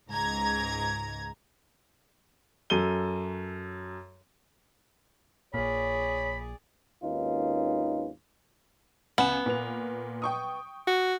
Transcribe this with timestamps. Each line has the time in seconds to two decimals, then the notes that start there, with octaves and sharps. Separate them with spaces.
0.11 C#2 G#2 A#5 G#6
2.70 F#2 A4 D#7 G7
5.54 A#1 A#2 G#4 C#5 D5 B5
7.04 G#1 D#2 C#4 D#4 F4 B4
9.18 C#2 B3 G#5 E7
9.46 A#2 B4 F7
10.22 G5 C#6 D#6
10.87 F#4